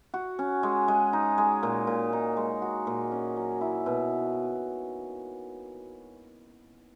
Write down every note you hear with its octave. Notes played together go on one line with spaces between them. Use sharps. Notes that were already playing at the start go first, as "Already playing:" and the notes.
F#4
C#4
G#3
G#3
D#4
G#3
A#2
A#2
D#4
G#3
F#4
A#2
C#4
F#3
E4
B2